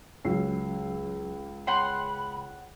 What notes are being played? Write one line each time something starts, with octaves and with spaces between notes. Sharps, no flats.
C#2 F#3 C#4 E6 C7
C#5 F#5 G5 B5 C6